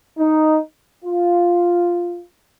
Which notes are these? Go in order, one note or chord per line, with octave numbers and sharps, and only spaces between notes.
D#4
F4